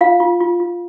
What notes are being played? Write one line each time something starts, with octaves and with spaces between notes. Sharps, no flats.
F4 F5
F4
F4
F4